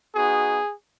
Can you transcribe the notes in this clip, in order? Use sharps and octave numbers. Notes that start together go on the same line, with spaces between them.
B3 D#4 F#4 G#4